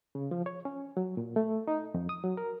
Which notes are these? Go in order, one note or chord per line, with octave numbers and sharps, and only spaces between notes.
C#3
F3
C#5
C#4
F#3
A#2
A3
D#4
F2
D#6
F#3
A#4